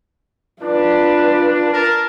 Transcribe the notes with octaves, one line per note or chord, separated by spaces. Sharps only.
D4 F4 B4
A#4 A5